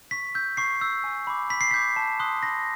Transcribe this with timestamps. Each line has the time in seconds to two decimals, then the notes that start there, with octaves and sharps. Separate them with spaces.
0.11 C#6 B6
0.35 E6 G6
0.57 C#6 C7
0.81 E6 G6
1.04 G#5
1.27 B5 D6
1.50 B5 B6
1.61 C7
1.71 D6 G6 B6
1.96 A5
2.20 C6 D#6 F#6
2.43 B5 A#6